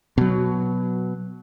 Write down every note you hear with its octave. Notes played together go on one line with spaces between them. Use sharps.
B2 F#3